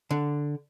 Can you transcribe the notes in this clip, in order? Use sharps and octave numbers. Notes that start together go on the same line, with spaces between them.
D3